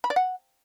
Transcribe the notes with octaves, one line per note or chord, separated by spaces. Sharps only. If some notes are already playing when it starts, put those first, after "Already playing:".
B5
D5
F#5